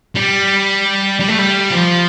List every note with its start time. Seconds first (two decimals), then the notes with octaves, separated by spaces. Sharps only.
0.16 G3
1.20 G3
1.28 A3
1.38 G3
1.72 F3